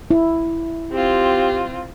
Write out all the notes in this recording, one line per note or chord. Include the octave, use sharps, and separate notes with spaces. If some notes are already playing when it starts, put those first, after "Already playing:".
E4
C4 F4 G4